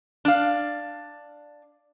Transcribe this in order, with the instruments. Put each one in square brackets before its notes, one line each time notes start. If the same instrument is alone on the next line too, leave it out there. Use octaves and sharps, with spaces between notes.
[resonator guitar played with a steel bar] D4 F5